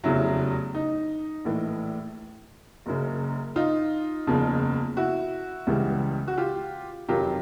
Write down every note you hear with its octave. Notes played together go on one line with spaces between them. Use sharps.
F1 E2 C#3 F#3 E4
D#4
A#1 A2 E3
F#1 F#2 C#3
D#4 F4
F#1 E2 C#3 F3
E4 F#4
C#2 C#3 E3 G3
F#4
F4 G4
F2 C3 D#3 F#3 F4 G4